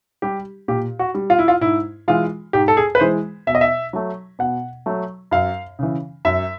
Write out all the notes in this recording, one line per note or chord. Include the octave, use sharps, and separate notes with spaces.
G3 G4
A#2 G4
F#4
G3
F4
E4
F4
G#2 E4
E3 G#3 F4
G#2 G4
A4
G#4
B4
E3 G#3 C5
B2 E5
D#5
E5
F#3 A3
B2 F#5
F#3 A3
F#2 F5
C#3 E3
F#2 E5